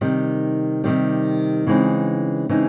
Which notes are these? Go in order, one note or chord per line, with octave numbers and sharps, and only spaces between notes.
C3 D#3 G3
C3 D#3 G3
C#3 E3 G#3 C4 D#4
C#3 E3 G#3 C4 D#4